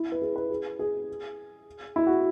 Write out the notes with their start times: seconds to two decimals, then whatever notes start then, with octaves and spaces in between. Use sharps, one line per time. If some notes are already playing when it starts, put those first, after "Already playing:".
Already playing: E4
0.12 B4
0.22 G#4
0.36 B4
0.50 G#4
0.79 G#4
1.96 E4
2.07 F#4